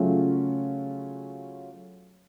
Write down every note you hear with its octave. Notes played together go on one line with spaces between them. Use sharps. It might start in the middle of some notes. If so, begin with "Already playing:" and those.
Already playing: C#3 F#3 A3 C#4 F4